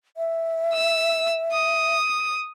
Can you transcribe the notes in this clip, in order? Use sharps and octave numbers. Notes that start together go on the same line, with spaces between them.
E5
E6
D#6